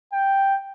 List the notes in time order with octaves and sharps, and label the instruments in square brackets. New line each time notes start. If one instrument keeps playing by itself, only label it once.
[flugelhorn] G5